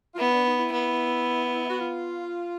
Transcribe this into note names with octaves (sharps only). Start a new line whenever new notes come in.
F4
B3 E4
D4
D#4
E4
B3
F#4
F4